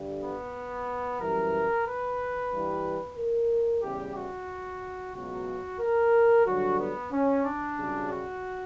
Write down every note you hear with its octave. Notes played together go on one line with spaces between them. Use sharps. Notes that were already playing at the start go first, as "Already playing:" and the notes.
Already playing: G2 D3 G3
B3
F#2 E3 G3 A#4
B4
G2 E3 G3
A#4
E2 C#3 G3 G4
F#4
C#2 B2 F#3 F#4
A#4
G2 D3 F#3 F#4
B3
C#4
D4
F#2 C#3 G3
F#4